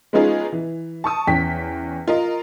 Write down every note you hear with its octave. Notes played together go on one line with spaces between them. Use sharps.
G#3 B3 C#4 D#4 F4 G#4
E3
A5 C#6 D#6
E2 C#4 G5 B6
F4 A#4 D#5